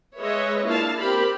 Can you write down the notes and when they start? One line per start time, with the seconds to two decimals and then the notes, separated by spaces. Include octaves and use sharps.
0.19 G#3 B4 C#5 D#5 E5
0.66 A#3 D4 E4 F4 F5 A5
0.98 C4 G4 A#4 B5